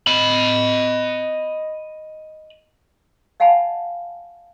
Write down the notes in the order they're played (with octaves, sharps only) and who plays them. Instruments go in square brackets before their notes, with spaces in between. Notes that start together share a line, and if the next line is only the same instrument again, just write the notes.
[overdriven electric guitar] D#5 B5
[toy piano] D#5 F5 F#5 G#5 A5 B5